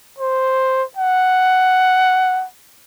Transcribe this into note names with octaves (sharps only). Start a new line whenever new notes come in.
C5
F#5